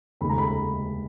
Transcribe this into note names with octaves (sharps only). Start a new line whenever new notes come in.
F1 D#2 C#3 G#3 B5
A#5
B5